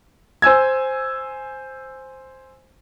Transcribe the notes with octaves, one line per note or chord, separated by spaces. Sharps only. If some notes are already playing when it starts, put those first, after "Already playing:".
C5 G#5 E6 G#6